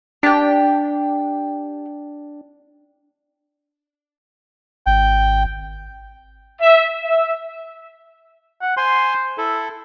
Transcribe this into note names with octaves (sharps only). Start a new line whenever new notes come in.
D4 G4 G5
G#1 G5
E5
E5
F#5
C5 G#5 C6
E4 A4